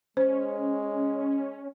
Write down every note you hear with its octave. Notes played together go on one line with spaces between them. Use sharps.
G#3 C#4 C5